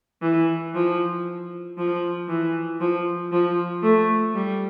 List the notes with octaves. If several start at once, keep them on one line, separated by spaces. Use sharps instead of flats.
E3
F3
F3
E3
F3
F3
A3
G3